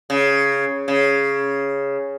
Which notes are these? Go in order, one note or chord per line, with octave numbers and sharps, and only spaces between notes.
C#3
C#3